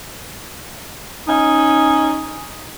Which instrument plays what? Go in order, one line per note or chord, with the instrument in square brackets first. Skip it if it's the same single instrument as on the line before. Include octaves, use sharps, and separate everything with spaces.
[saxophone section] C#4 D#4